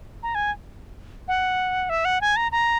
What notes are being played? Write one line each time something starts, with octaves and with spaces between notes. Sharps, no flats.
A#5
G#5
F#5
E5
F#5
G#5
A#5
A#5